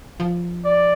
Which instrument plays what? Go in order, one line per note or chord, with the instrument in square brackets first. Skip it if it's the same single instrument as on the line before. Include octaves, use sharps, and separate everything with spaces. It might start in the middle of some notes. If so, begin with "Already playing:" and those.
[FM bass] F3
[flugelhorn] D5